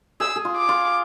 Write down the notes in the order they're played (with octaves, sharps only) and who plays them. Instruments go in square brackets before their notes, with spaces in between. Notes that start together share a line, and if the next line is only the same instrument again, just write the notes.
[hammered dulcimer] G#4 [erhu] E6
[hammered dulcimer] G#4
F4
[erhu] D6
[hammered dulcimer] F4